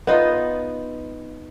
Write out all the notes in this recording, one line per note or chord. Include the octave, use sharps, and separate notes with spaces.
B3 D#4 F4 D#5